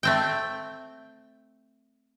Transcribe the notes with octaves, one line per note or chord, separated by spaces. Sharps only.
A3 C4 G5